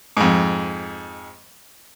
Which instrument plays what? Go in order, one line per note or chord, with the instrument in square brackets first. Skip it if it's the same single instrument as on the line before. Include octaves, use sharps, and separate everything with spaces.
[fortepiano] F2 G#2